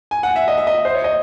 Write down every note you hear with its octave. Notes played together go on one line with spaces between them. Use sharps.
G#5
F#5
E5
D#5
E5
D#5
C5
C#5
D#5